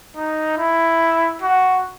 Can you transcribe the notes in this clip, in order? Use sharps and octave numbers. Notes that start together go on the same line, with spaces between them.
D#4
E4
F#4